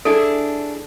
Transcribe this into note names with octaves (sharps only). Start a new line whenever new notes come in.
D4 E4 G#4 A4